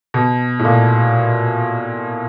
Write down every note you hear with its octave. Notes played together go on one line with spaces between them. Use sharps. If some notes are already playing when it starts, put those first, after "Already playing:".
B2
A2
A#2